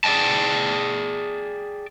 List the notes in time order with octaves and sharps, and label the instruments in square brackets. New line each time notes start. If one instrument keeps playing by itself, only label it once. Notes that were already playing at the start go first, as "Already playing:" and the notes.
[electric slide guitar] G#4 D5 D#5 G5 A5